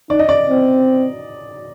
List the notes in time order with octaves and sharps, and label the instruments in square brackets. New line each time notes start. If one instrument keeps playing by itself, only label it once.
[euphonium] D#4 [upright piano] D5
[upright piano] D#5
D5
[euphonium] C4